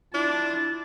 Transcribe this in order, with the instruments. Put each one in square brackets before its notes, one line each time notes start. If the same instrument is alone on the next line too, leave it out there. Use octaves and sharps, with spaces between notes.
[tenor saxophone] D4 [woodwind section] E4 F4 [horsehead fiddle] A5